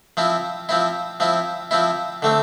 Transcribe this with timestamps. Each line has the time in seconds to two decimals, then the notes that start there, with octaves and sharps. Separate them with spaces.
0.17 F3 C4 E4
0.69 F3 C4 E4
1.20 F3 C4 E4
1.71 F3 C4 E4
2.22 D3 A3 C4